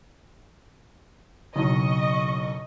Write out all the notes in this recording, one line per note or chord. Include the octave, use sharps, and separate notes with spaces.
F#1 B1 D#5 C#6